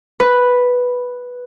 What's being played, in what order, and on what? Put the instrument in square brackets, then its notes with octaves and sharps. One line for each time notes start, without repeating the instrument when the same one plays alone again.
[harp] B4